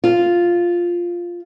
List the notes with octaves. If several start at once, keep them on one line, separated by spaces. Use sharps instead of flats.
F4